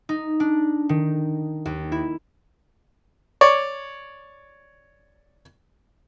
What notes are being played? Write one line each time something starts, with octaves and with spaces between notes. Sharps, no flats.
D#4
D4
D#3
D#2
E4
C#5 D5